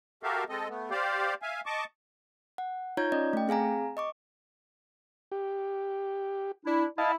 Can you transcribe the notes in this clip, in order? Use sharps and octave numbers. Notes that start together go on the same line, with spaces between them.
F#4 G4 A4 A#4 E5 F5
G#3 C4 A4 D#5
A3 B3
G4 C5 D5 F5
E5 F5 G#5
D#5 A5 C#6 D6
F#5
D#4 F4 C#5 A#5 G6 G#6
C#4 D5 D#5
A3 G5
C4 G#4 F5 G#5 A#5
D#5 C#6 D6
G4
D4 E4
E4 D#5 F5 A5